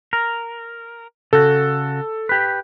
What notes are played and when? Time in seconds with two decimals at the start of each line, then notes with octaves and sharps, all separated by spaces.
0.13 A#4
1.33 C#3 F#4 A4
2.29 G4 B4